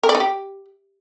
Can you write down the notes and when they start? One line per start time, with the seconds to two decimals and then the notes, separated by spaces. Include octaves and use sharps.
0.03 A#4
0.09 D5
0.15 D#4
0.20 G4